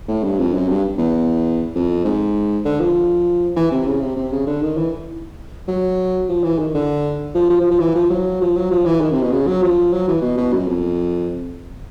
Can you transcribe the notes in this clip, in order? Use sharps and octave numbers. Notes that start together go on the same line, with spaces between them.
A2
G2
F2
F#2
G2
E2
F2
G#2
D3
F3
E3
C3
C#3
C3
C3
C#3
D3
D#3
E3
F#3
F3
E3
D#3
D3
F3
F3
F3
F3
E3
F3
F#3
F3
F#3
F3
E3
D#3
C3
B2
C#3
F#3
F3
F#3
E3
B2
B2
F#2
F2